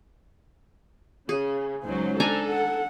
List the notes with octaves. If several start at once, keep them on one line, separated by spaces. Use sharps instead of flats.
C#3 G#4
C#2 F#3 D#4 C5
D4 A4 G#5 A#5
F#5